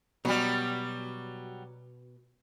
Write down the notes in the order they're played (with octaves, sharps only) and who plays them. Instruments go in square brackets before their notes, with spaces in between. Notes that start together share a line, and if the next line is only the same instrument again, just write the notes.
[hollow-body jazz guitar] B2 [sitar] F#3 G3